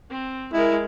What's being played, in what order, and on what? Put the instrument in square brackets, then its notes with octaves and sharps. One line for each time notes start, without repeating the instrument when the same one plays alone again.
[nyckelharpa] C4
[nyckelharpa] G#3 A#4 [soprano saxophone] E4